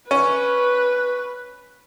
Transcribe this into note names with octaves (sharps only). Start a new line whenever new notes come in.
C#4 B4